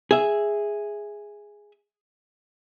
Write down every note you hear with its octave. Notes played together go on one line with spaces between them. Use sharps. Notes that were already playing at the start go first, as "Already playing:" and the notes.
G#4 E5